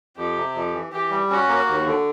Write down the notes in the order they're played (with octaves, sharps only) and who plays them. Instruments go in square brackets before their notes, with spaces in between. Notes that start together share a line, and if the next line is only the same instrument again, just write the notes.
[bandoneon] F2 [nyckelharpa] G4
[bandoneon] C3
F2
E3
[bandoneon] E3 [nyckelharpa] G4
[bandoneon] G3
[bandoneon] C#4 [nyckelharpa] F#4
[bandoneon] A#3
D#2
D3